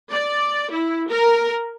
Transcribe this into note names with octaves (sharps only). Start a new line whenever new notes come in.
D5
E4
A#4